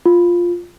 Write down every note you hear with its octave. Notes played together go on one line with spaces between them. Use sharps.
F4